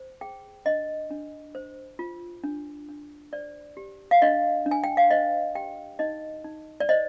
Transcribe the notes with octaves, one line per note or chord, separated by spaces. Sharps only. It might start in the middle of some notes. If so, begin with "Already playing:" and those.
Already playing: C5
G#4 G5
D4 D#5
D4
C5
F4
D4
D4
C5 D5
G4
F5
D4 D#5
D4
G#5
G5
F5
C5 D#5
G4 G5
D#4 D#5
D#4
D5
C5 D#5